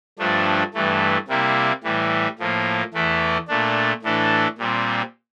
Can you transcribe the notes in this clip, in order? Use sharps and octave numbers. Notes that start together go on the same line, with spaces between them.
G2 F3 A3 D4
G2 E3 A3
C3 G3 A#3 E4
A2 E3 G3
A2 F3 A#3
E2 E3 A3 E4
A#2 A3 D4
A2 E3 A3 D4
A#2 G3 C4